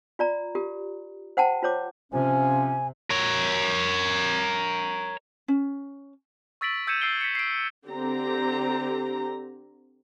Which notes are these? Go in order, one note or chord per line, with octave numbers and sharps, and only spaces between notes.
F4 D5 A#5
F4 G4 A#4
C5 F#5 G5 A5 A#5
F4 C5 C#5 D6
C3 F3 C#4 G#5
A#4 C#5
C#4
C#6 E6 A6 B6 D7 F#7
E6 G6 G#6 C#7 D#7 E7
E6 C7 D7 G7
B6 C#7
C7 D7
D3 C4 G4 A#5